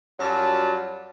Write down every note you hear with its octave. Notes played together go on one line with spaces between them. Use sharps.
F#2 F#3 G3 F4 A5